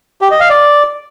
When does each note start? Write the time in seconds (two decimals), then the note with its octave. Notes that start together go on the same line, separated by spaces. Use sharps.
0.22 G4
0.31 D#5
0.40 F5
0.50 D5